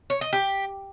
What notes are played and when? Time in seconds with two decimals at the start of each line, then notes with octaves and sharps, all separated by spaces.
0.10 C#5
0.21 D#5
0.33 G4